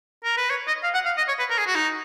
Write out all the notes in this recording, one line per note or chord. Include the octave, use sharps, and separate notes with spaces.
A#4
B4
C#5
D#5
F5
F#5
F5
D#5
C#5
B4
A#4
G#4
F#4
D#4